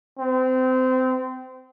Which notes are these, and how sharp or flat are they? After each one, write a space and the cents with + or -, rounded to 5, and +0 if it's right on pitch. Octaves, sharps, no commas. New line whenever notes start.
C4 -25